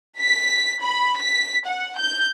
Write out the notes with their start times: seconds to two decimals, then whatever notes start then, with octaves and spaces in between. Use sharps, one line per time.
0.19 B6
0.82 B5
1.19 B6
1.66 F#5
2.00 G6